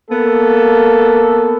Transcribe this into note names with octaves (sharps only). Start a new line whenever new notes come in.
A#3 B3 A4